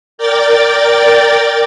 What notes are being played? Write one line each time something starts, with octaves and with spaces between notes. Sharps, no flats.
A#4 D5 G5 A6